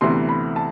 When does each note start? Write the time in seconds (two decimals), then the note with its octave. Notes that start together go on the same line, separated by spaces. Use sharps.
0.01 D2 C3 E3 B3 C6
0.29 B5
0.56 A5